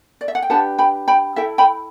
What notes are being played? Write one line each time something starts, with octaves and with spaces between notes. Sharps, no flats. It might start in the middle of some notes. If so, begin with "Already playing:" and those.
D5
E5
F#5
G5
D4 G4 B4 F#5 A5
G5 B5
G5 B5
E4 A4 E5 G5
G5 B5